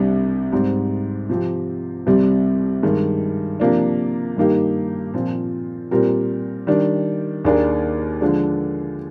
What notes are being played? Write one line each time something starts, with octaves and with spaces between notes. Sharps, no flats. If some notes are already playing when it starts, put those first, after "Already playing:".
Already playing: C2 C3 G3 D4
G#2 G3 C4
C3 F3 C4 G4
C2 C3 G3 C4
G2 D#3 G#3
C3 F3 A#3 D4
G2 D#3 A#3 D#4 G4
A#2 F3 C4
A#2 G3 C4 G4 A#4
D#3 G3 D4
D#2 D#3 A#3 D4 G#4
D3 F3 G#3 D4